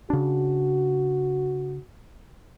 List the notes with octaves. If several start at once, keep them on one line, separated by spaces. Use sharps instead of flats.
C#3 D4 F#4